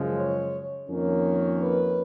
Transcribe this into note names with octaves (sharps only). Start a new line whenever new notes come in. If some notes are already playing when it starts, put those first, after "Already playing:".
Already playing: F#2 C#3 F3 G#3
C#5
F2 D#3 A#3 C#4
B4